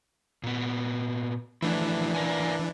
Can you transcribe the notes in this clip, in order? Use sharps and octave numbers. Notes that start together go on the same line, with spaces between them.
A#2 B3
E3 F3 A3 D4 E4
A#4 D5 G#5